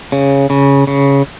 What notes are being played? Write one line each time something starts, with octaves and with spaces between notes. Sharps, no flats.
C#3
C#3
C#3